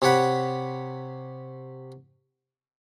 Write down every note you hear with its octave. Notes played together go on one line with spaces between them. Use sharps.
C3 G4 C#5 F#5 B5